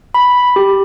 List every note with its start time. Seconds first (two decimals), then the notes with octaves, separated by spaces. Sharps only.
0.14 B5
0.56 G4